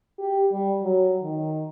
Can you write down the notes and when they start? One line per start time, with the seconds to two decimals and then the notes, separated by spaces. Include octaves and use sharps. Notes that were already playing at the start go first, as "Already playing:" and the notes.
0.19 G4
0.52 G3
0.82 F#3
1.22 D#3